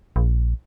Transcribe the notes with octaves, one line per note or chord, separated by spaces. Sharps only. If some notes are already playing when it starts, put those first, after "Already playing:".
A#1